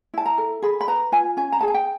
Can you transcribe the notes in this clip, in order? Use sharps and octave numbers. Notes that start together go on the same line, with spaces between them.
E4 A5
A#5
A4
G#4 B5
B5
B4 A#5
F4 G#5
C#4 G#5
A#5
G#4 A5
G#5
G5